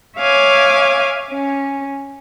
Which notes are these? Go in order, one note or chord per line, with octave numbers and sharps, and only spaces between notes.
C#5 E5 F5 G#5 D6
C#4